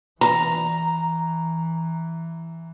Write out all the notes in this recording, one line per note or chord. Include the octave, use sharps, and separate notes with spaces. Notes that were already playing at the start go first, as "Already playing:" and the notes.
E3 A#5